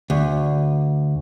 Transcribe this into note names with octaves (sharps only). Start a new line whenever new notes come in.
D2